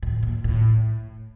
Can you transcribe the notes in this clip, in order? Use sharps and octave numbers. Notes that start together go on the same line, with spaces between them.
A2
A#2
A2